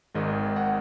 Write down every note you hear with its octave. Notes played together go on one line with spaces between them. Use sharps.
G#1 G#2 D#3 G#3 D#5
F#5